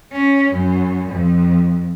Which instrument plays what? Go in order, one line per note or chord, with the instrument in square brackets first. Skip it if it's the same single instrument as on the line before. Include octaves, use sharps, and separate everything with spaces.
[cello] C#4
F#2
F2